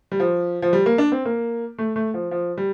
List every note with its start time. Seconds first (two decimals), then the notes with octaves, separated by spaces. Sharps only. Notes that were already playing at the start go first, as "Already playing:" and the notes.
0.12 G3
0.20 F3
0.62 F3
0.73 G3
0.86 A#3
0.98 D4
1.12 C4
1.25 A#3
1.78 A3
1.96 A3
2.14 F3
2.31 F3
2.58 G3